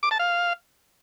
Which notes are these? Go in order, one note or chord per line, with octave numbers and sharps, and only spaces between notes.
D6
A5
F5